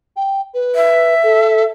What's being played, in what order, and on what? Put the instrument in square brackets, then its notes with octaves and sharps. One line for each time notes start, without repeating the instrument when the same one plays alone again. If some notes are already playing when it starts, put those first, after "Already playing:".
[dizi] G5
B4
[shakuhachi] E5
[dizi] A4